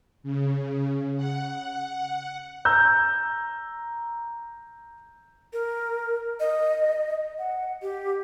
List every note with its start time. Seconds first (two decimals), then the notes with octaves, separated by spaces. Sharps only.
0.23 C#3
1.17 F#5
2.65 A#5 E6 G6
5.53 A#4
6.40 D#5
7.39 F#5
7.82 G4